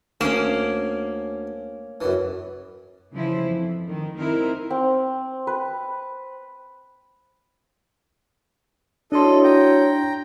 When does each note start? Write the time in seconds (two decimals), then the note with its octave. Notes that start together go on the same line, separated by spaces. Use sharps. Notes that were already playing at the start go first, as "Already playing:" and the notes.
0.21 D2 A#3 C#4 F5 D#6
2.01 F#2 E3
3.12 C#3 E3 F3 E4 C5
3.49 F2
3.88 D#3
4.18 C4 D#4 E4 A#4
4.70 C4
5.47 B4
9.12 D4 E4 F#4 A4 C#5 D#5 C6
9.43 G5 A#5